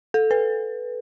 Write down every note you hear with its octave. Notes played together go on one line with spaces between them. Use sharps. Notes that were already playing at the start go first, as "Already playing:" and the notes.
A4
B4